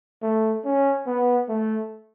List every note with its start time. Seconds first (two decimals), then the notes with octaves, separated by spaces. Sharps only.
0.23 A3
0.65 C#4
1.07 B3
1.49 A3